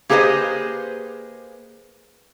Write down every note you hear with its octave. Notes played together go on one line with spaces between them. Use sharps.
A#3 G4 G#4 B4 C5 D#5